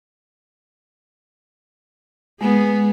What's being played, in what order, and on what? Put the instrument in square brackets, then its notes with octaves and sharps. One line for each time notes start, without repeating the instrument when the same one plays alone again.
[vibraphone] G#3 [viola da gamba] B3 G#4